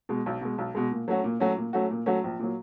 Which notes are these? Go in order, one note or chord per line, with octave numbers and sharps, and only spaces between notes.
B2 G#3
B1
B2 G#3
B1
B2 G#3
A#2
F#3 A3 C#4 F#4
A#2
F#3 A3 C#4 F#4
A#2
F#3 A3 C#4 F#4
A#2
F#3 A3 C#4 F#4
A#1
A#2 F#3